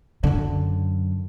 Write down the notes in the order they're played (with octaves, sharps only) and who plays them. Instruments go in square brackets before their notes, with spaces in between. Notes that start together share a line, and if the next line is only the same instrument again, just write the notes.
[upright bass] F#2 D3